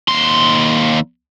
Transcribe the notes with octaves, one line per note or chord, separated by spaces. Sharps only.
D#2 C6